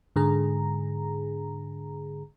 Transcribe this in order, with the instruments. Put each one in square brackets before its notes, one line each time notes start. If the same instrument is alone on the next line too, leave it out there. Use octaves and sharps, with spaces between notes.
[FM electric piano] G#2 D3 G#4 A#5